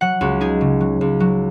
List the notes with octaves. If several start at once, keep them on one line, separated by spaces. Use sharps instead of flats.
F#3 F#5
C#2 F#4
D#4 G#4
C#3
F#3
C#2
F#3